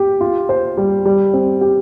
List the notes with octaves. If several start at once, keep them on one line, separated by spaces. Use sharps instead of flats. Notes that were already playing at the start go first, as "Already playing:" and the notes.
Already playing: G4
F4
C5
G3
G3
C4
G4